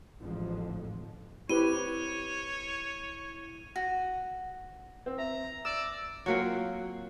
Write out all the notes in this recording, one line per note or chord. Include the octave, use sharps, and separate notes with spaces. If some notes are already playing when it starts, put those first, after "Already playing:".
A1 F2 G#2 D3 F3
C4 E4 G4 B4 C#5 D#7 G7
F#4
C4
E5 A#5
D5 E6
F#3 A#3 C4 F4 F#4 C#5